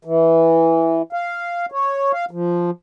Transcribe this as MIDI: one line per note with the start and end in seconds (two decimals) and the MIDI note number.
0.05 1.02 52
1.13 1.66 77
1.72 2.12 73
2.13 2.25 77
2.31 2.71 53